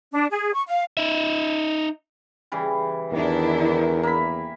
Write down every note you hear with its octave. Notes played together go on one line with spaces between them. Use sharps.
D4
G#4
C#6
F5
D#4 E5
C#3 E3 G3
E2 D#3 D4 E4 A#4
A#3 E5 B5